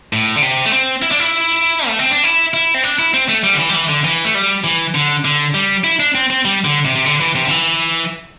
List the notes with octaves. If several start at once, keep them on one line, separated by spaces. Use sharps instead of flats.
A2
D3
C3
A3
C4
E4
D4
E4
A3
C4
D4
E4
E4
C4
D4
E4
C4
A3
G3
D3
E3
G3
E3
D3
E3
A3
G3
E3
D3
D3
G3
E4
D4
C4
C4
G3
D3
C3
C3
D3
E3
C3
D3
E3